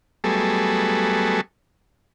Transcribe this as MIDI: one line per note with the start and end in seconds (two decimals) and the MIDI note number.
0.24 1.41 54
0.24 1.41 55
0.24 1.41 57
0.24 1.41 59
0.24 1.41 68
0.24 1.41 69